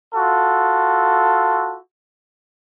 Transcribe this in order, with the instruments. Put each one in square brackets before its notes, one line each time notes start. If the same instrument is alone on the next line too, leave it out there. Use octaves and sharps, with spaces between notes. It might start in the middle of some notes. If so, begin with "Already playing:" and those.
[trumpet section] F4 F#4 A4